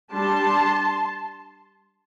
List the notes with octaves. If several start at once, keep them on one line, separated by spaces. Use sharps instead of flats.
G3 D4 A5 C6